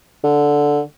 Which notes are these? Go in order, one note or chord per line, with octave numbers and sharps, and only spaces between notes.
D3